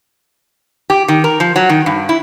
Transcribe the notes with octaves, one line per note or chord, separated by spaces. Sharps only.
G4
D#3
A#4
F3
F#3
D#3
G2
E4